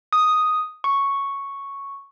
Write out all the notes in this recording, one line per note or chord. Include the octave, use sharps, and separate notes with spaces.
D#6
C#6